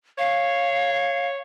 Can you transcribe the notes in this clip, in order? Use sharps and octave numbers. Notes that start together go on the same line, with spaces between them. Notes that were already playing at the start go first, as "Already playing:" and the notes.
C#5 F5